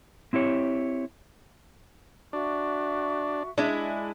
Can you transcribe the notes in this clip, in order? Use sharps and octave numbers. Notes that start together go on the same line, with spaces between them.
C4 E4 G4 C#5
D4 F#4 E5 C#6
G#3 D4 E4